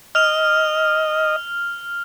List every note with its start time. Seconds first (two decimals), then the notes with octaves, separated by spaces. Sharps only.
0.15 D#5 F6 F7